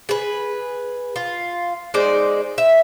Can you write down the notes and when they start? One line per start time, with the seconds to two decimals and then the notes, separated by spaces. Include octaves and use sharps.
0.09 G#4 B4
1.16 F4
1.94 G#3 D#4 C5 D5
2.58 E5